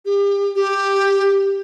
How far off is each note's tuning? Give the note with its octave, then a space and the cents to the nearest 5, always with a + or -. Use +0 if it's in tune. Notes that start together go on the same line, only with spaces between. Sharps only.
G4 +35
G4 +5